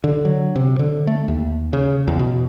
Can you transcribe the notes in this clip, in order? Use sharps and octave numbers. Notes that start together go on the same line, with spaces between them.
D3
F#3
C3
D3
A3
D#2
C#3
E2
B2